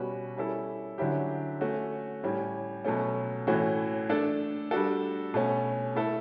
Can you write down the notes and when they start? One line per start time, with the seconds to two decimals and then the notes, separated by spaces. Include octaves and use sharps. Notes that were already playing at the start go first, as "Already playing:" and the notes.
Already playing: B2 G3 C#4 F#4 B4
0.37 G3 C#4 E4 A4
0.98 D3 F#3 C#4 E4 G4
1.61 A3 C#4 F#4
2.23 A2 G3 C#4
2.85 B2 F#3 A3 C#4
3.47 A2 E3 A3 C#4 F#4
4.09 A3 D4 A4
4.71 G3 D4 F#4 A4
5.34 B2 A3 C#4
5.96 A3 E4 A4